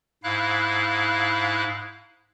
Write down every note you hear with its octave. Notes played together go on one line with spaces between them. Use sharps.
G#2 E4 F5 F#6